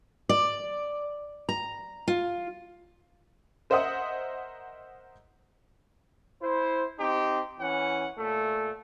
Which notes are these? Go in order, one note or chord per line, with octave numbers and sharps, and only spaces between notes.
D5
A#5
F4
A#4 C5 D#5 E5 F#5 D#6
E4 C5
C4 D#4 G4
E3 C#4 F#5
A#2 A3